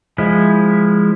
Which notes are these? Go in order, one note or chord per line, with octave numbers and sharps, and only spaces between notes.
F3 G#3 E4